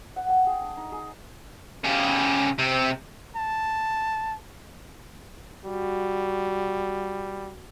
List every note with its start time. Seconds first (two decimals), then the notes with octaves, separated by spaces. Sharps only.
0.16 F#5
0.29 G5
0.47 G#4
0.61 D4
0.77 D#4
0.92 G#4
1.84 C#3 G4
2.58 C3 C4
3.36 A5
5.65 G3 F#4